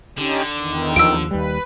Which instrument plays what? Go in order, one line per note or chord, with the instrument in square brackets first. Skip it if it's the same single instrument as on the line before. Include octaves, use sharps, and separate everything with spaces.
[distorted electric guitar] D3 [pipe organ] C#4 D#4 G4
[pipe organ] E2 D#3
[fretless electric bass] D#2 F3 [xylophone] E6 D7
[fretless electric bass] D#2 G3 [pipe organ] B4